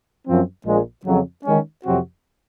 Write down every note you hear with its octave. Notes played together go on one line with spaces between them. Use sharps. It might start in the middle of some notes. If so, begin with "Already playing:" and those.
F#2 F3 C4
A#1 A#2 F3 G#3
F2 C#3 F#3
D#3 G#3 C#4
F2 C3 F#3 C4 F#4